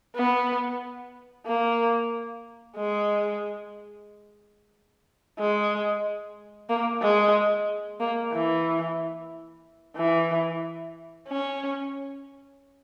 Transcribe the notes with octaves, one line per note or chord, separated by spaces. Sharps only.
B3
A#3
G#3
G#3
A#3
G#3
A#3
E3
E3
C#4